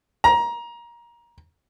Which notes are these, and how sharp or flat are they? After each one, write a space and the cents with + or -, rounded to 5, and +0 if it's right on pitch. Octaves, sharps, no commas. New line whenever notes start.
A#5 +20